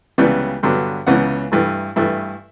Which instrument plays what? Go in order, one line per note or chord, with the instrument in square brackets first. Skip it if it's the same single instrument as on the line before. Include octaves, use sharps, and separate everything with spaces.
[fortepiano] C#2 C#3 E3 G3 B3 G5
G2 D3 F#3 B3
C#2 C#3 E3 B3 F#5
G2 E3 A3
G2 E3 A3 E5